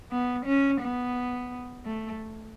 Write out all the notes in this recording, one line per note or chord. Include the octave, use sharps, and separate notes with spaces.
B3
C#4
B3
A3